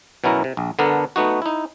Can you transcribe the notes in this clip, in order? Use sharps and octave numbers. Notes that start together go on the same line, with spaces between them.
B2 F#3 C#4 E4 A#4
C3
A#1
D3 B3 D4 A4 A#4
A3 B3 D#4 F#4
D#4 E4